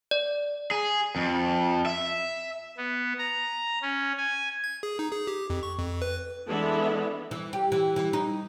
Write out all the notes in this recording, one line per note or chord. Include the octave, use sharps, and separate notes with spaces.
D5
G#4
F2
E5
B3
A#5
C#4
G#5
G#6
G#4
D#4
G#4
G4
F2
C#6
F2
B4
E3 G#3 B3 D4 A4 E5
E3
G4
E3
E3
D#4